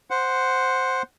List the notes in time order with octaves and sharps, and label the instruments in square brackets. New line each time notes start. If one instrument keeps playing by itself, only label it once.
[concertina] C5 F#5